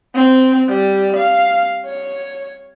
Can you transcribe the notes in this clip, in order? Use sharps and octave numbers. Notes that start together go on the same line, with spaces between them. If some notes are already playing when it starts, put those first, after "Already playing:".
C4
G3
F5
C#5